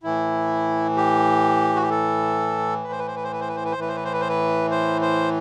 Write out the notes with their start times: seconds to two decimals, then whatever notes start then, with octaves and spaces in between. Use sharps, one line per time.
0.03 A2 E3 E4
0.96 G4
1.76 F#4
1.82 G4
1.90 A4
2.84 B4
2.92 C5
2.99 B4
3.07 C5
3.16 B4
3.24 C5
3.32 B4
3.40 C5
3.48 B4
3.56 C5
3.65 B4
3.72 C5
3.77 A2 E3 B4
3.88 C5
3.96 B4
4.05 C5
4.13 B4
4.20 C5
4.29 B4
4.71 C5
5.01 C5